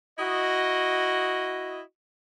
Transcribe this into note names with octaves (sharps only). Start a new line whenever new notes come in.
E4 F#4 D#5